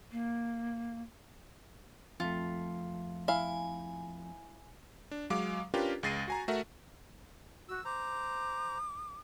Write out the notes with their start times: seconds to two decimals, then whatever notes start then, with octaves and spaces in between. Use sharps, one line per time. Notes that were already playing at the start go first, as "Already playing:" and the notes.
0.11 A#3
2.20 F2 A3 F4
3.28 E4 F5 G#5
5.11 D4
5.30 F#3 G#3 F5 D6
5.74 C#4 D4 F4 G4 A#4 B4
6.03 C#2 G#3 A6 A#6 C7 D#7
6.28 F#4 G#5 A#5
6.48 A3 F#4 A#4 E5 F#5
7.69 F#4 E6
7.85 C5 A#5 D6